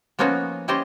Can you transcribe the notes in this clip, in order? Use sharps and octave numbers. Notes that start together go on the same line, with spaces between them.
F3 A#3 B3 C#4 D#4 F#4
C#4 E4 G4 C5 D5 D#5